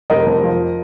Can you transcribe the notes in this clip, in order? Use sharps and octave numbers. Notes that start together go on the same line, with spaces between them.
F1 A#4 D#5
F2
F3